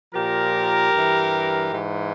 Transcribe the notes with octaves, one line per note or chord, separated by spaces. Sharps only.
A#2 F3 G4 A#4
G2 E3
G#2 E3